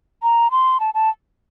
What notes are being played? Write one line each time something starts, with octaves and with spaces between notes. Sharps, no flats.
A#5
C6
A5
A5